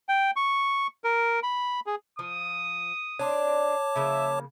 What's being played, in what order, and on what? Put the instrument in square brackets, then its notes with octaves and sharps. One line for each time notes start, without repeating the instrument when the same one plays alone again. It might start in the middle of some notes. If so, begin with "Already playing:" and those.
[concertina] G5
C#6
A#4
B5
G#4
[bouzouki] F3 [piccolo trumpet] D#6
[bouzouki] C4 D4 [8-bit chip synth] C#5 A5 D6
[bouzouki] C#3 F3 A#3 [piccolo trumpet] E5